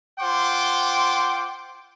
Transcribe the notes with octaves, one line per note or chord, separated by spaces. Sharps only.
F4 C5 F#5 G5 C6 D6